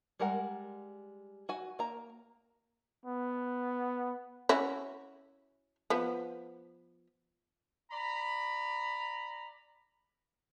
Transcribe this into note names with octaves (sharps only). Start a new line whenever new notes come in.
G3 G#3 A#4 F#5
F#4 G#5
A#3 A#5
B3
C#4 E4 F#4
F3 B3
D5 A#5 B5